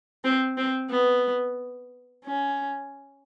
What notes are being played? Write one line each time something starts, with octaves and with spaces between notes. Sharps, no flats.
C4
C4
B3
C#4